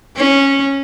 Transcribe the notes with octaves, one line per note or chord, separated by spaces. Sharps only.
C#4